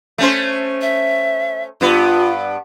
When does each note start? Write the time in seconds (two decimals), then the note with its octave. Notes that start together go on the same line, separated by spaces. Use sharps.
0.18 A3 C#4 C5
0.81 E5
1.81 G2 B3 F4